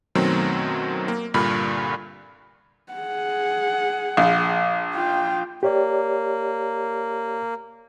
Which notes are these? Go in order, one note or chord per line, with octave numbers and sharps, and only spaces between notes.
F#2 B2 D#3 F#3 A3 C4
A#3
C2 G2 A#2 D3 B5 F6
G#4 F#5
A#1
F4 G5
A#3 G4 C#5 D5